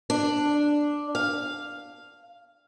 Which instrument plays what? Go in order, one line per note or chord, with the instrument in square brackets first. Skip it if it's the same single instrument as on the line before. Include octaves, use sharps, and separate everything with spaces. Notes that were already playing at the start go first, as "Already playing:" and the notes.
[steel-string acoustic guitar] D4
F5